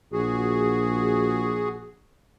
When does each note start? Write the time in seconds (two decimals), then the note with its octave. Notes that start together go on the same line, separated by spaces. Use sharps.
0.13 A#1 F#4 G#4